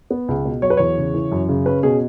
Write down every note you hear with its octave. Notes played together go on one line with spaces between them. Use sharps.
B3
C#2
B2
F#3 C#5
B4
E2 C#5
C#3
E3
F#2
C#3
C#4 B4
B2 G#4